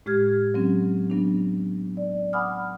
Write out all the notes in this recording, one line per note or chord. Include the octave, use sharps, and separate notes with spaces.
A2 G#3 G4 F6 G#6
F#3 C4 C#4
F#3 B3 D4
D5
F#5 G#5 B5 D6 D#6 F6